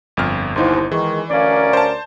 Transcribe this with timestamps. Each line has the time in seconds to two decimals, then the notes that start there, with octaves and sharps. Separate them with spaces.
0.17 G1 F2 F6
0.56 G1 D#2 D#4 E4 C5 C6
0.92 D#3 E3 G#3 G#4 C#6
1.30 D2 C#4 A#4 D5 F5 D6
1.73 C5 A5